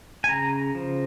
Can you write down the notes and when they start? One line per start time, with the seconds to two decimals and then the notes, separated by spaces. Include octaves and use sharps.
0.24 G#5
0.29 C#3 A#5
0.75 F3